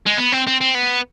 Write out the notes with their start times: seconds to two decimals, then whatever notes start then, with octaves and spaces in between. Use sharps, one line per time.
0.06 G#3
0.17 B3
0.32 C4
0.47 C4
0.61 C4
0.75 B3